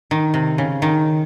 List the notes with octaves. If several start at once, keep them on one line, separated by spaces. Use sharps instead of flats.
D#3
C3
C#3
D#3